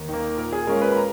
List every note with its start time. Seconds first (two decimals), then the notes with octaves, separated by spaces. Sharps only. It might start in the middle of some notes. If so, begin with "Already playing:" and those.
Already playing: D#2
0.09 D#3 A#3
0.38 A#2 A#4
0.53 G#4
0.67 G#3 C#4 F4 A#4
0.82 B4
0.92 B5
0.97 A#5